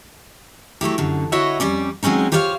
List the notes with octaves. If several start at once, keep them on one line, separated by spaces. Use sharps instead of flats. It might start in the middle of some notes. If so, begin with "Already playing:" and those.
F#3 A3 E4 G4
F#2 D3
E4 F#4 C#5 D#5 E5 F#5
F2 G3 C#4 D5
F#3 G#3 C4 C#4 D#4
F4 G4 C5 C#5 D#5 F5